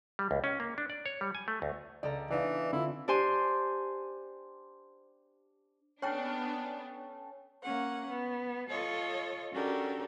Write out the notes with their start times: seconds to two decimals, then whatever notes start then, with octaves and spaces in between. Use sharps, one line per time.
0.19 G3
0.31 C#2
0.44 C#4
0.60 A#3
0.78 D4
0.90 D5
1.06 C#5
1.21 G3
1.35 G#5
1.48 A3
1.62 D2
2.03 C#2 A4 D5 A#5
2.31 E3 B3 D4 D#4 D5 F5
2.73 D3 C4 E4 F4
3.08 D4 G4 C5 G#5 C6
6.02 B3 C#4 D4 A4 C#5 G5
7.63 A#3 C#4 F#5
8.10 B3
8.69 F4 A4 C#5 D#5
9.52 C#4 D4 F#4 G4 A4 A#4